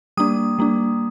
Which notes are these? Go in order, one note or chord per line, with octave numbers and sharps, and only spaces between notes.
G3 A#3 D4 D#6
G3 A#3 D4